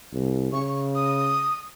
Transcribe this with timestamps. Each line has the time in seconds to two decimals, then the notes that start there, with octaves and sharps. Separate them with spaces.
0.13 C2
0.53 C#3 C#6
0.95 D#6